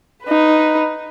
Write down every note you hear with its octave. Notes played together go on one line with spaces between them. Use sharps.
D#4 B4